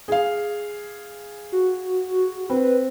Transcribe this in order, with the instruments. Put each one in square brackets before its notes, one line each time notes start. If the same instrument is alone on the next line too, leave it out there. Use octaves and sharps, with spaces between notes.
[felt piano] G#4 F5
[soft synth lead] F#4
[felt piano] C4 [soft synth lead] B4